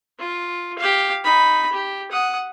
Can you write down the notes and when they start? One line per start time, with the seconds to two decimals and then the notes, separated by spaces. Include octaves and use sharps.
0.19 F4
0.78 G4 F5
1.24 D#4 B5
1.72 G4
2.11 F#5 D#6